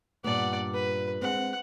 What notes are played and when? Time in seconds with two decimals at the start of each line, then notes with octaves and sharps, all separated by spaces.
0.24 G2 A#2 B3 D5 F#5
0.74 B4
1.22 G#3 C4 F#5